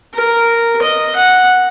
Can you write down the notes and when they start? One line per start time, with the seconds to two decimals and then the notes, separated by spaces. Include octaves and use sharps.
0.14 A#4
0.82 D#5
1.16 F#5